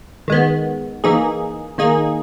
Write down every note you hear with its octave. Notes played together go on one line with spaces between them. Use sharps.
D#3 G#3 B3
E3 A#3 D#4 G#4
D#3 A#3 D#4 G#4